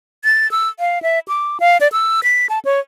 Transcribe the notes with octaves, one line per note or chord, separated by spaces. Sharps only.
A6
E6
F5
E5
D6
F5
D5
E6
B6
A5
C#5